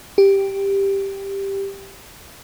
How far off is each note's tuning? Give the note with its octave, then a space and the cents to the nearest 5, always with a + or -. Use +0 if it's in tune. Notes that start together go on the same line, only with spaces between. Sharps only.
G4 +5